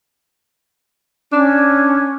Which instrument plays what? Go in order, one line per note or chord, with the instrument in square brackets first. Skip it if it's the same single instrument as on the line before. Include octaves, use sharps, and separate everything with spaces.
[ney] C#4 [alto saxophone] D4